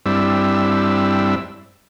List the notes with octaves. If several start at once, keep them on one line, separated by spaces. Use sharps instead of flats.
G2 G3 C4 D4 E4 E6